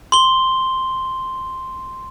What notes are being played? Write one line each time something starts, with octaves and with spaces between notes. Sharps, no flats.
C6 G7